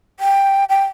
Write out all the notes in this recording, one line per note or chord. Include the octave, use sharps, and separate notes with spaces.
G5
G5